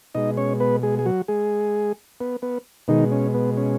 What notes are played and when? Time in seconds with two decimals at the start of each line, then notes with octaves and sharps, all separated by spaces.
0.15 B2 G#3 D#4 D#5
0.37 C#4 C#5
0.60 B3 B4
0.83 G#3 G#4
0.99 G#4
1.06 F#3 F#4
1.28 G#3 G#4
2.21 B3
2.42 B3
2.88 B2 D#3 G#3 D#4
3.12 C#4
3.34 B3
3.57 C#4